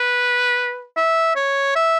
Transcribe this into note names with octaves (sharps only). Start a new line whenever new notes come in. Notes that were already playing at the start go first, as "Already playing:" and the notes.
Already playing: B4
E5
C#5
E5